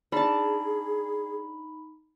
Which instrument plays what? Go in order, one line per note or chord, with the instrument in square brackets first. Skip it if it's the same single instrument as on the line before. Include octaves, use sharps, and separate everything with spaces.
[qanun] D4 A5 [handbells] D#4 B5 [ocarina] G#4